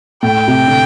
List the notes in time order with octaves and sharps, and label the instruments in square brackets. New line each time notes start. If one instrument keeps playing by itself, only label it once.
[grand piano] A2 [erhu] G5
[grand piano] C3
D3